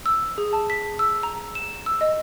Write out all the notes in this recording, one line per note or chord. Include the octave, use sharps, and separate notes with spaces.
E6
G#4
A5
B6
E6
A#5
E7
E6
D#5